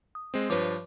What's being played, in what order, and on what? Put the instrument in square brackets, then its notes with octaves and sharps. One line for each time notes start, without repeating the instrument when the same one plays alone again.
[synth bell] D#6
[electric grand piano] G#3 C4
[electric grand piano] G2 F3 [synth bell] B4 C#5 D6